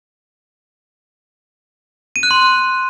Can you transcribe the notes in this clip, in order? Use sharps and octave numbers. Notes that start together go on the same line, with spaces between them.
D#7
F#6
C6